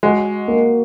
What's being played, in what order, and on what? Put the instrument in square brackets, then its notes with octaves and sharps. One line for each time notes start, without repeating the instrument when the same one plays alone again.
[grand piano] G#3 [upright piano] F#4
[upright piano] A#3